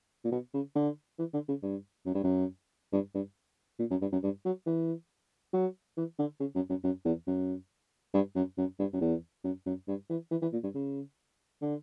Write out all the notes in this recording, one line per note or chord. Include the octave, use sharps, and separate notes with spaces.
A#2
B2
C#3
D3
E3
D3
C#3
G2
F#2
G2
F#2
G2
G2
A#2
F#2
G2
F#2
G2
F#3
E3
F#3
E3
D3
C#3
F#2
F#2
F#2
E2
F#2
G2
F#2
F#2
G2
F#2
E2
F#2
F#2
G2
E3
E3
E3
A#2
G2
C#3
D3